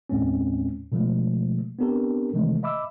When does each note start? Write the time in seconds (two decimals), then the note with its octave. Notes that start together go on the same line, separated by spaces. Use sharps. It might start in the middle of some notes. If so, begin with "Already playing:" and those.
0.10 D#2 A2 G#3 C4 C#4
0.92 B2 D3 F3 G#3 A3
1.79 B3 C4 D4 G4 A4 A#4
2.34 C3 D#3 E3 G#3 A3
2.63 D#5 E5 B5 D6 E6